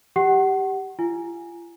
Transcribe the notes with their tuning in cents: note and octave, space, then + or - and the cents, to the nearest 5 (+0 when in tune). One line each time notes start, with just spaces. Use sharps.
G4 +0 F#5 +25
F4 -45 G#5 +0